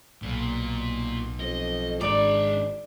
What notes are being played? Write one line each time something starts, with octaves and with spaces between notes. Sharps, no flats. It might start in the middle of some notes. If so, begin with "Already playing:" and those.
B1 A#2
F2 D#5
G#1 G#3 D4 D5 A#5